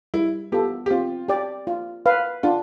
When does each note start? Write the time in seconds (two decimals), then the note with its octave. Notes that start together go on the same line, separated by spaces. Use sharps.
0.14 G3 E4
0.52 B3 F4 G4 A4
0.86 G4
0.90 C4 F4
1.28 G4 D5
1.67 F4
2.06 B4 F5
2.43 D4 F4